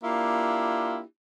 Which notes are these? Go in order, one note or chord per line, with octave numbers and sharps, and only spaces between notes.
A#3 D4 E4 F4 G4